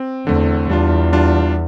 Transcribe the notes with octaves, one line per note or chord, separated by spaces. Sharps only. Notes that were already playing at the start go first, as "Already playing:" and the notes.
Already playing: C4
E2 D3 A3 C4
E2 G3 D4 F4
G3 D4 F4